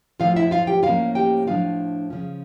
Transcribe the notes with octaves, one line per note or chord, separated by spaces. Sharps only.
A2 F3 A3 F4 F5
E4 E5
F4 F5
G4 G5
A2 F3 A#3 C#4 F4 F5
G4 G5
A2 F3 A3 D4 F4 F5
C#3 F3 C#4